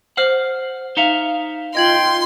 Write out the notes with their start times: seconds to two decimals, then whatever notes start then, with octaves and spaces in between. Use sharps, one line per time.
0.17 C5 F#5 F6 C7
0.97 D#4 E5 F5 A#5 C#7
1.75 F4 D#5 G5 C6 G#6 F#7